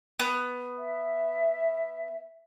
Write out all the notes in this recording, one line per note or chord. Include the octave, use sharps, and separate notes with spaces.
B3
E5